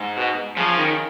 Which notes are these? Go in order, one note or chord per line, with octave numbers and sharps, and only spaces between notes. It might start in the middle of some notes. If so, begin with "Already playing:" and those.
Already playing: G#2
B2
C#3 F3
D#3